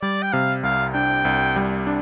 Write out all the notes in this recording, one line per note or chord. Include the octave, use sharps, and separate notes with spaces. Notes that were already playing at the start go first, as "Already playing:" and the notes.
G3 D5
G5
C3 F5
C2 F5
D4 G5
C2
G3
D4